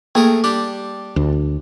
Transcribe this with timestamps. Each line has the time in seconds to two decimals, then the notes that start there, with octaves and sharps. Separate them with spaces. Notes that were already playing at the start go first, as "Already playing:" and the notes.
0.15 A3 A#3 G#4 A#4
0.44 G3 D4 G4
1.16 D2